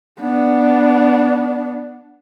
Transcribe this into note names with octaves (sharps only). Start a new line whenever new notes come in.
B3 D4